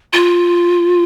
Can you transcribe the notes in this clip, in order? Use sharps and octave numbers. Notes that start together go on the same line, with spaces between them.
F4